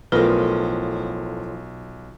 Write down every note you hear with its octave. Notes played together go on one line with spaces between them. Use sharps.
B1 A2 F3 A3 B3 F4 A#4